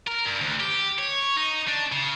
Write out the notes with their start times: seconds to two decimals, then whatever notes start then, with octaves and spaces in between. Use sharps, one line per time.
0.07 A#4
0.25 G2
0.41 D2
0.60 G4
0.98 C#5
1.37 D#4
1.68 D4
1.92 C#3